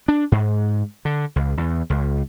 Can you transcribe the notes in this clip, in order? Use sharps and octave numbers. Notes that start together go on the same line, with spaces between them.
D4
G#2
D3
C#2
E2
C#2